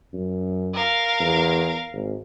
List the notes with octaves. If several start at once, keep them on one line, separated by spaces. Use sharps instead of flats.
F#2
A#4 F5
E2
G#1